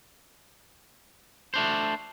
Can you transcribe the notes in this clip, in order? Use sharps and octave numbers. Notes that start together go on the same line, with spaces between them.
A3 D4 C5